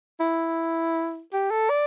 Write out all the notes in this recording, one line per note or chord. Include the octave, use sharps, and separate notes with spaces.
E4
G4
A4
D5